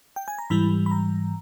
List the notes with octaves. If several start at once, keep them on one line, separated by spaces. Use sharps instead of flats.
G5
G#5
A#5
G#2 E3 G3 B5
B5
A#5